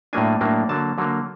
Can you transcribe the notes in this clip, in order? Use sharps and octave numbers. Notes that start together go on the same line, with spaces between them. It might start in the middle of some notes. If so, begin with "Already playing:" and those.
A2 F#3 A#3 D4 G#5
A2 F#3 A#3 D4
D3 F#3 A#3 A5
D3 F#3 A#3